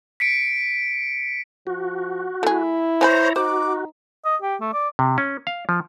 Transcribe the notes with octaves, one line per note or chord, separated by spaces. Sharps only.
B6 C#7 D7
F3 F#4
A3 E4 G#4
E3 C5 C#5 G#5 A#5 B5
D#4 F#4 C5 D6
D#5
G4
A3
D5
C3
C#4
F5
F3